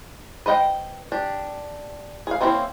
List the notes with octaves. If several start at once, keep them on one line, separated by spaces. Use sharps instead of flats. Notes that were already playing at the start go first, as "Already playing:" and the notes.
B4 C5 D#5 F5 G5
D4 G4
G#4 F5
A#3 C4 C#4 E4 C5